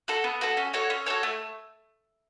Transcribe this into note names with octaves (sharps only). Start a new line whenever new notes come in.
F#4 A4
B3
F#4 A4
C#4
F#4 A4 C#5
C#4
F#4 A4 C#5
A3